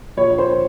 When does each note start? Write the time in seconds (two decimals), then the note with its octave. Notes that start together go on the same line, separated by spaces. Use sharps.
0.17 A#1 C#5
0.38 C5